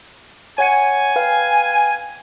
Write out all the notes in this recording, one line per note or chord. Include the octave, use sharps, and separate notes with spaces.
C#5 F#5 G#5 C#7
B4 F5 G5